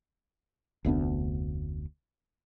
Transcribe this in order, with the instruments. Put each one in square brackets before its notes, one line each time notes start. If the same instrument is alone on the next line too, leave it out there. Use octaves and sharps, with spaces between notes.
[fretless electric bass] F1 D2 B3 D4